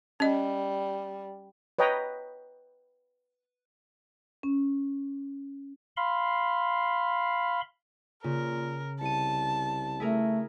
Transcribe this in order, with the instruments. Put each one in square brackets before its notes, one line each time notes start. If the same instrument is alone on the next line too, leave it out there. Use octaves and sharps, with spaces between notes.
[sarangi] G3 [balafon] C#4 D#5
[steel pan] B4 C#5 D#5 G5 A#5
[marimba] C#4
[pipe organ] F5 B5 C6
[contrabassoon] A#2 [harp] C#3 [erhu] A#4
[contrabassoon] C2 [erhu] A5 [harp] C#7 D#7
[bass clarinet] A3 [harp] E4 G#4 A#4